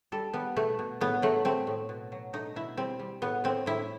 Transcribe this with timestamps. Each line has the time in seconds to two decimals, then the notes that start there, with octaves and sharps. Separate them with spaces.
0.12 G3 A4
0.33 G3 B3
0.56 B2 A3
0.79 B2
1.01 A2 B3
1.22 F#3 A3
1.45 A3 C4
1.67 A2
1.89 B2
2.12 F#3
2.33 A3 D#4
2.56 B2 E4
2.77 G3 C4
2.99 G3
3.22 A2 B3
3.44 A2 C4
3.66 A2 E4